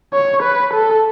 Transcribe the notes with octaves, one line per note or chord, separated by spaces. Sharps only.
C#5
B4
A4